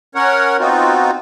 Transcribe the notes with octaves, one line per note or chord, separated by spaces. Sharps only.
C#4 A#4 C#5 F#5
B3 C4 D#4 F4 F#4